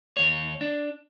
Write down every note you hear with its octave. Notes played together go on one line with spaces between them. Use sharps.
D#2 C#5
D4